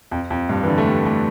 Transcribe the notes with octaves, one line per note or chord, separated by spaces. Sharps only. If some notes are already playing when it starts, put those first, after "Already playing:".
F2
F2
G2
E3
D3
A3
G3
A3